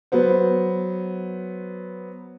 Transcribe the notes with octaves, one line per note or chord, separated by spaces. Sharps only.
F#3 B3 C5